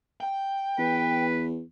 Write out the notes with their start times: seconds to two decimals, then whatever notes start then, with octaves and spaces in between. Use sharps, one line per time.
0.20 G5
0.78 E2 B4